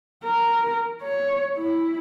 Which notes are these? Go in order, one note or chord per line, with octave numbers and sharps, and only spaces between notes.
A#4
C#5
E4